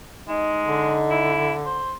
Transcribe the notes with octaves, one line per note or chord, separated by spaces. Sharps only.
G#3 D#4
D3
E4
C5